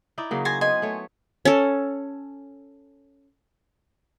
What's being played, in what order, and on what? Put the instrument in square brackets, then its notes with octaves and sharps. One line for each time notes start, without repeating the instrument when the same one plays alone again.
[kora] D#4 E4 D5
C#3 F#3 A#3
[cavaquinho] G#5 C6 [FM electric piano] A6 A#6
[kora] B3 [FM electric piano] D#5 C6 [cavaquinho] G#5
[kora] A3 C#5
[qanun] C#4 A4